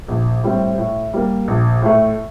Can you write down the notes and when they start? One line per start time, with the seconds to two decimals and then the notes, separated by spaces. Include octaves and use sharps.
0.08 A#1
0.43 A2 G3 C4
0.78 A2
1.14 G3 A#3
1.48 A#1
1.82 A2 A3